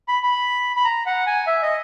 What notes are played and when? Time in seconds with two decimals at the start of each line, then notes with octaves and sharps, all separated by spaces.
0.08 B5
0.23 B5
0.76 B5
0.85 A#5
1.06 F#5
1.26 G#5
1.47 E5
1.62 D#5